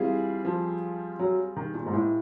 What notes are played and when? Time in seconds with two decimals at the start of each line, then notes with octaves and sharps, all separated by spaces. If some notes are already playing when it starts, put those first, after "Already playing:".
Already playing: E3 G3 C4 F4 G#4
0.45 F3
1.19 F#3
1.56 D#3
1.74 A#2
1.86 G#2
1.93 A2